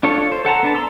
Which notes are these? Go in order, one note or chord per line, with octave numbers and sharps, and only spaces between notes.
D4 F4 A4 C#5
C5
A4 F#5 A5 A#5
B3 D4 A5
A#5 C6 E6